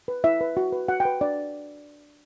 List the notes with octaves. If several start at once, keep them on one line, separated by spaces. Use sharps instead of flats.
B4
E4 E5
B4
F#4
B4
F#4 F#5
G5
B4
D4 D5